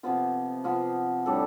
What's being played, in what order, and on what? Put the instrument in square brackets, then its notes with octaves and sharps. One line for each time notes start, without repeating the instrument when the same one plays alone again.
[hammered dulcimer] C3 F3 B3 F4
C3 F3 B3 F4
A2 G3 D4 A4